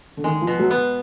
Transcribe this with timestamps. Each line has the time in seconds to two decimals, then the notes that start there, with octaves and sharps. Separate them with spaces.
0.17 D3
0.24 D#3 G#3
0.42 F3
0.47 B2
0.59 F#3
0.71 B3